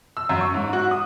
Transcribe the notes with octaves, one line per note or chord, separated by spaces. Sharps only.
E6
F#2
C#6
G#2
F#4
D#6